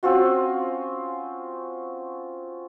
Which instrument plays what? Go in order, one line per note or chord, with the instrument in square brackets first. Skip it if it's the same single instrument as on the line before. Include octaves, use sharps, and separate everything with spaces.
[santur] C4 C#4 F4 F#4